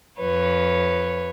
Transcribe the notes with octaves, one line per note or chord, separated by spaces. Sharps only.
F2 B4 C#5